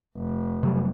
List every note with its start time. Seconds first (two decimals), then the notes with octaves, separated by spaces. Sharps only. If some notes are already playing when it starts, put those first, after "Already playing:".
0.17 F1
0.63 C3 F#3 G3